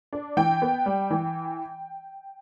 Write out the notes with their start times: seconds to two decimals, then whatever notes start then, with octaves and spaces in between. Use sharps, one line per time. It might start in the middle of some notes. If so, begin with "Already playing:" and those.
0.13 D4
0.37 E3 G5
0.62 B3
0.86 G3
1.11 E3